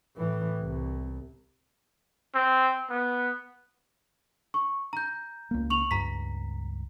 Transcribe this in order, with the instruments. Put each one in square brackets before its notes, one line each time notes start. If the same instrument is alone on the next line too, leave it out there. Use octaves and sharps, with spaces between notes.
[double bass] A2 E3
C2
[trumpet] C4
B3
[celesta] C#6
A#5 G6
[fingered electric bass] C#2 A#3
[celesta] C#6 F7 F#7
[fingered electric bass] C#2 G2 [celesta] A#5 B6